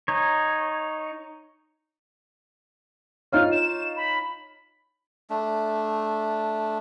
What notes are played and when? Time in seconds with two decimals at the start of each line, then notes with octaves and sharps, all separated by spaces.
0.08 D#4 C#5
3.32 D#4 F4 C#5 F6
3.51 E7
3.96 B5
5.30 A3 D4